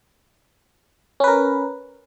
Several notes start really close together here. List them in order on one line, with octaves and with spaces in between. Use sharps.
C#4 B4 A#4